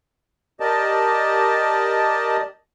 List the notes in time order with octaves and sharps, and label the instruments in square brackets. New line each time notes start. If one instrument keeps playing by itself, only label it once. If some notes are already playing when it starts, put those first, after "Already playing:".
[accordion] G4 A#4 D5 D#5 A5